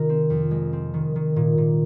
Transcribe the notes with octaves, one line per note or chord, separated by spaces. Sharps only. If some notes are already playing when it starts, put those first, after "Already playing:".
Already playing: C3 D#3 F4 A#4
C4
F2
G#3
C4
D#3
D#3
A#2
A#2